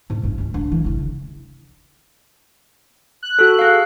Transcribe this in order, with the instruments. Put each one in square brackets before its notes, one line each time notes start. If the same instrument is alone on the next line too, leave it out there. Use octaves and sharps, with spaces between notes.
[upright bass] G#2 B3
G2 C#4
D#2 C#4
C2 D4
E3
E2 C#3
[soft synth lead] F#6
[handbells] F#4 A4
G#4 F5